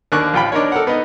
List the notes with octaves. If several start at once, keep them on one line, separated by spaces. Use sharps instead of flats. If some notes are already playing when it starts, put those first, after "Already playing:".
D#2 A#3 D4 C#6 F#6
A1 F4 G5 B5
D4 D#4 A#4 C#5
A4 A#4 F#5
B3 D#4